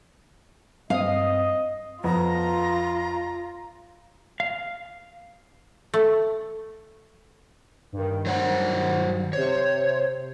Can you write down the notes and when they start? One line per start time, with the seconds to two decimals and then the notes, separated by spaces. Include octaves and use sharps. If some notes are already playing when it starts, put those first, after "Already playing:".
0.90 G2 C4 D#5 F5 D#6
2.04 F2 B3 F4 A#5
4.40 F5
5.94 A3
7.92 G2 D#3
8.26 F#3 C5 F#5
9.33 C3 C5 C#5